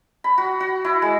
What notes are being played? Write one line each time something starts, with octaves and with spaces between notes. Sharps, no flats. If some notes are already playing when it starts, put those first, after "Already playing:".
B5
F#4
F#4
E4
G#3